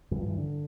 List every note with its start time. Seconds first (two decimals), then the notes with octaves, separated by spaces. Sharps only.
0.11 G2 E3
0.16 D3
0.20 F3
0.29 E3
0.38 D3